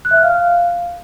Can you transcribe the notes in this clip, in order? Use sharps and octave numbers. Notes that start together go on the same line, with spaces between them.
F#6
E5
F6
F5